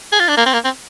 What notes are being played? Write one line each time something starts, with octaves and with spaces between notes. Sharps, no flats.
G#4
F4
D4
A#3
C4
A#3
C4